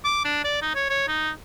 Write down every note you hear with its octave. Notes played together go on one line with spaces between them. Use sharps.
D6
D4
D5
D#4
C#5
C#5
D#4